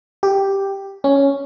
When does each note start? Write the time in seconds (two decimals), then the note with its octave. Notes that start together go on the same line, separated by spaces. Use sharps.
0.23 G4
1.04 C#4